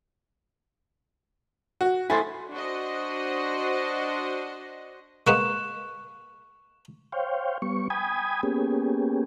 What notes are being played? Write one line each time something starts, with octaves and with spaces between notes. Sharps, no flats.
F#4
E4 A4 C5 G#5
D4 F#4 C5 D#5
G#3 A#3 B3 C#6 F#6 E7
C5 C#5 F5 G5
G3 B3 C#6
G5 G#5 B5 D#6 G#6
A#3 B3 C#4 G4 G#4